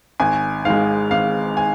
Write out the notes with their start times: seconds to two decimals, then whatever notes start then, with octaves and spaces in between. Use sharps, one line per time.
0.20 G#1 G#5
0.65 G#2 G#3 F5
1.11 G#1 F5
1.57 G#5